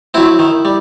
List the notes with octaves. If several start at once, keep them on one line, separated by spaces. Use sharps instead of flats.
F#3 C4 E4
D#3
G3